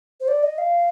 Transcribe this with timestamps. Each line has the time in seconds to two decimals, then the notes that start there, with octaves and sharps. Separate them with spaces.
0.20 C5
0.28 D5
0.43 D#5
0.58 F5